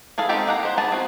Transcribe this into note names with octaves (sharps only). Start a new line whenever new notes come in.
E3 G#4 A4 F5
G#3 C4 D#4 G4 A4
A#3 F#5 A#5
G4 C5
B3 D#4 G#4 A5
C4 F#4